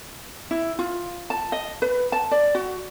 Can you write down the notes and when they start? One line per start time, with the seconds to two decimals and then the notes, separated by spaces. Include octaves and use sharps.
0.51 E4
0.79 F4
1.30 A5
1.52 D#5
1.82 B4
2.12 A5
2.31 D5
2.55 F#4